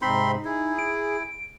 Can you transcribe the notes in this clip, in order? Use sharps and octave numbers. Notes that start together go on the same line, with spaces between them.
G#2 C3 G#3 C4 D#4 B5 C6
E4 G#4
D7